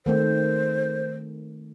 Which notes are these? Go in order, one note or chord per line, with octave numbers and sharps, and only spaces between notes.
D#3 A3 C4 C5